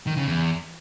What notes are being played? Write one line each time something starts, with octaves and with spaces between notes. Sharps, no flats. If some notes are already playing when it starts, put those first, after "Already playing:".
D#3
C#3
E2